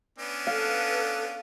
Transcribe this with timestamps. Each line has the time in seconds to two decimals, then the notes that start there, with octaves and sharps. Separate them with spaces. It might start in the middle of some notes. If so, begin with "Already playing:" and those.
0.19 B3 C#4 D4
0.47 A4 B4 F5